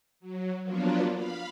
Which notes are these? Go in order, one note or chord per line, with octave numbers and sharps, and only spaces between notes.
F#3
F3 F#3 A#3 B3 D4 F4
F5 B5